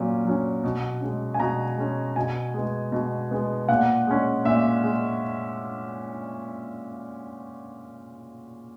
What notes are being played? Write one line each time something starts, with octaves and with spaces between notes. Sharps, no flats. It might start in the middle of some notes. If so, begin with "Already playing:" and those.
Already playing: A#2 F#3 C#4
F#3 C#4
B2
G#3 C#4
G#5
B2 A#5
G#3 C#4
B2 G#5
G#3 B3
B2
G#3 B3
A#2 F#5
G#3 C#4
A#2 E5
G#3